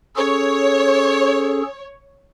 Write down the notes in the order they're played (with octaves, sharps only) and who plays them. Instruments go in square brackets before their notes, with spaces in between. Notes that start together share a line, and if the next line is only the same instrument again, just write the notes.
[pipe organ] C#4 G#4 A4 [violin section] C#5